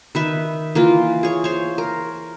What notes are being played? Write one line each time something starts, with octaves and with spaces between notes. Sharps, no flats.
D#3 B4 E5
E3 A#3 F4
G#4 C#5
C5 C#5
A#4